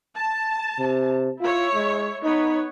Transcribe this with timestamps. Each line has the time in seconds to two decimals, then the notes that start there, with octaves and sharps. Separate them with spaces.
0.16 A5
0.79 C3
1.41 E4 F4 C#5
1.75 G#3
2.24 B3 D#4 C#5